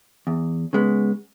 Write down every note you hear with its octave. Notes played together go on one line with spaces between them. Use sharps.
E2
C#3 G#3 B3